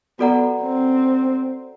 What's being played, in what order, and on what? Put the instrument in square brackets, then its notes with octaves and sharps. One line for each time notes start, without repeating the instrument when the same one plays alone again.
[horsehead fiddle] B3 [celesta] F#4 A4 D5 F#5 A#5
[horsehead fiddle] C4